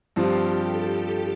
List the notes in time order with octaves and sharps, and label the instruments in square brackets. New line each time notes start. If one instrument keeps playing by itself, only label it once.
[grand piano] G2 F3 C4 F4 [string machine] G4
[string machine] A4